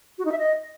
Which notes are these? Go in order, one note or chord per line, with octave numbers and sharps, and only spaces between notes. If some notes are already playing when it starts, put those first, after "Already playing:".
F#4
D#4
E5
D#5